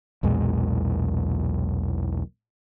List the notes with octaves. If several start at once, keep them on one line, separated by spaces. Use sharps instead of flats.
B1 E2 A#2 G#3